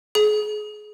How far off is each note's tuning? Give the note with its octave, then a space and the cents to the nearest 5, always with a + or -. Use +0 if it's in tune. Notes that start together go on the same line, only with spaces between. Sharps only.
G#4 +30